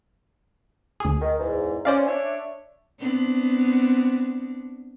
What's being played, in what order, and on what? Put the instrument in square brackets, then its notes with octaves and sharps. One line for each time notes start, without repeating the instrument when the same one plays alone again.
[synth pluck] D2 G#4
[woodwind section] D#3
E2 G#2
[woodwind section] C#4 [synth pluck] C5 D5 F5
[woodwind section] D4 C#5 E5
[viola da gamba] B3 C4 D4